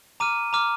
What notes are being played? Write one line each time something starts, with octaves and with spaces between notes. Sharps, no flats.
A#5 D6 F6 D#7
A#5 D6 F6